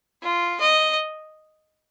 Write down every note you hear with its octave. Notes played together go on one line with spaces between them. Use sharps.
F4
D#5